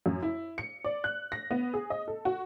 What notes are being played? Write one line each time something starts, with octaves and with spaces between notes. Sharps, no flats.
F#2
E4
C#7
D5
F#6
A#6
B3
G#4
D#5
A4
F#4